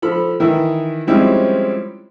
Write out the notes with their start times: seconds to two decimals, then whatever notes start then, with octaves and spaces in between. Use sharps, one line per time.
0.02 F3 A4 B5
0.40 D#3 E3 E4
1.07 F3 G3 G#3 C4 C#4 E4